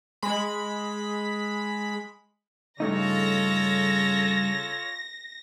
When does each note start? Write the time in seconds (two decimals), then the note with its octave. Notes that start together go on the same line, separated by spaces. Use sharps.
0.22 G#3 B5
2.80 G2 C#3 A3 D#4 F4 A4 C#5 A#6